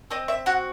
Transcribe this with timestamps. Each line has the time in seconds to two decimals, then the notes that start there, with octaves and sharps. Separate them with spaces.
0.11 C4 D#5
0.28 E5
0.46 F#4 F#5